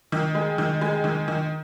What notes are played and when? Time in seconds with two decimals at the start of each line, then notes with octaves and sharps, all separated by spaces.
0.12 D#3
0.35 G#3
0.58 D#3
0.81 G#3
1.04 D#3
1.28 D#3